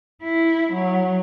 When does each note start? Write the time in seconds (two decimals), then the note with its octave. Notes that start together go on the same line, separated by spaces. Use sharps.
0.23 E4
0.73 F#3